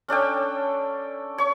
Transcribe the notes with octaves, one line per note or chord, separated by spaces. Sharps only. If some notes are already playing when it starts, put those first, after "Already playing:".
C#4 D4 A4 G5
C#5 C#6